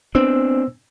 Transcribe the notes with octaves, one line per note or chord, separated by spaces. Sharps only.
B3 C4 D4 C5 E6